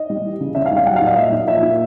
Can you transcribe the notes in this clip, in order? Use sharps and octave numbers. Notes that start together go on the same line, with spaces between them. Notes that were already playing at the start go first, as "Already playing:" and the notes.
Already playing: D#5
G3
E3
C#3
C#3 E5
F5
G3
F5
F#3 F#5
F5
A#2
D#5
F#3 E5
A#2 D#5
F3 E5
A#2